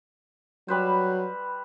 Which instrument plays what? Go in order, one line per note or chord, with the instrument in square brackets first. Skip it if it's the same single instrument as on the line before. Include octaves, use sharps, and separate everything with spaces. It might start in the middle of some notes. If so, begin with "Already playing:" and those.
[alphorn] F#3 [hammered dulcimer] G3 B4 C5